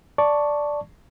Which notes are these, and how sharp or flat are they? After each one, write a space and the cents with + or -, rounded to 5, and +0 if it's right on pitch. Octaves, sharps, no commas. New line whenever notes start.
D5 +0 A5 +0 C#6 +0